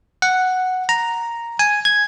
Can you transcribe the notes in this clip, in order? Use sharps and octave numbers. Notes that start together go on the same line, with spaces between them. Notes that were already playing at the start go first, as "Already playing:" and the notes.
F#5
A#5
G#5
G#6